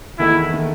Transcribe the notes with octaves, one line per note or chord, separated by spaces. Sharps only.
E2 D#3 A3 E4
D#3 A3